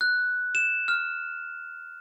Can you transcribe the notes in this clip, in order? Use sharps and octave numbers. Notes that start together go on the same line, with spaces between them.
F#6
E7
F6